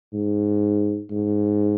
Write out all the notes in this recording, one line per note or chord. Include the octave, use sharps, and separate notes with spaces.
G#2
G#2